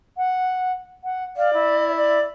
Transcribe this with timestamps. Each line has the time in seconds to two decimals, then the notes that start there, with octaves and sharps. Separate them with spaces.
0.17 F#5
1.04 F#5
1.37 D5 F5
1.53 E4
1.96 D5